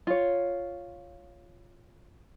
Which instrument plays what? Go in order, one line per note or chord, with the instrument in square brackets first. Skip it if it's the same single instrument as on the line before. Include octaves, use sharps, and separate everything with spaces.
[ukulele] F4 C#5